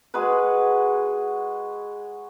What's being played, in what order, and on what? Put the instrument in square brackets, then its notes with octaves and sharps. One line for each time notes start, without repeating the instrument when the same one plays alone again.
[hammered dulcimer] G#3 F#4 G#4 B4